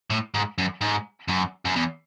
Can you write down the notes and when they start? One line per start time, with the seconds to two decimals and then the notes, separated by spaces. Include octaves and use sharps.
0.10 A2
0.35 G#2
0.58 F#2
0.81 G#2
1.28 F#2
1.65 F#2
1.76 E2